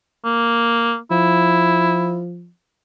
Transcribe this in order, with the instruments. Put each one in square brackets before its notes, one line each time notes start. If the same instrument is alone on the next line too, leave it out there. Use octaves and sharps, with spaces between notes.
[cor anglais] A#3
[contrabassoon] F3 [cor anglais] E4